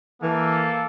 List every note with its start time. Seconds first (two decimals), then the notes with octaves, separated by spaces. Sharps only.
0.23 E3 A#3 A4